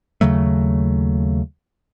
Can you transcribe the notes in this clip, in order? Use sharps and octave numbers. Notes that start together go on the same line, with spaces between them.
D#2 C#3 F#3 A3